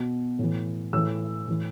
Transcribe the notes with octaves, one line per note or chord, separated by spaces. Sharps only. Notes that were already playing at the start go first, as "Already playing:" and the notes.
Already playing: B2
A2 E3
A2 E3 E6
A2 E3